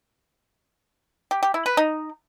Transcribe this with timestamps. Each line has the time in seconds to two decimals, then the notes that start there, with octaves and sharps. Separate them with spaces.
1.31 G4
1.43 G4
1.54 E4
1.66 B4
1.77 D#4